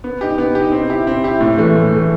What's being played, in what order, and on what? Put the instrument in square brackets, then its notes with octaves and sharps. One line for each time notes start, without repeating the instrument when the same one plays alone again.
[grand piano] B3
D#4 G4
B3
D#4 G4
C4
E4 G4
C4
E4 G4
A2
E3 A3
A2
E3 A3